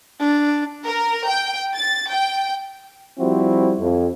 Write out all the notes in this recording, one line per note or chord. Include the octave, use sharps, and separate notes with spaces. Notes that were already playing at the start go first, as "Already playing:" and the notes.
D4
A#4
G5
A6
G5
F3 G3 C4 E4 F#4
F2